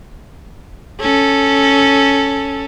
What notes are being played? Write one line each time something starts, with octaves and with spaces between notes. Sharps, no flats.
C#4 A4